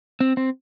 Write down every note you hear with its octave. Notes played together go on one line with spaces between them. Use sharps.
C4
C4